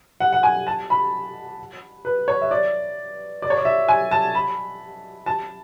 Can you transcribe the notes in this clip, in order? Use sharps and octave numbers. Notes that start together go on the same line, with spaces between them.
F#5
F#5
G#5
A5
B5
B4
C#5
E5
D5
D5
C#5
D5
E5
G#5
A5
B5
A5